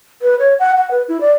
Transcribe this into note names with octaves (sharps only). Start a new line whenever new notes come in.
B4
C#5
F#5
F#5
B4
E4
D5